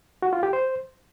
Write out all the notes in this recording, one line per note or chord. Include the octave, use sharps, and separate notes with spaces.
F#4
F4
G4
C5